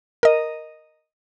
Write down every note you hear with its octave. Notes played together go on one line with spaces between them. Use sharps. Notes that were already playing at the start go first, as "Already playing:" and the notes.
A#4 D#5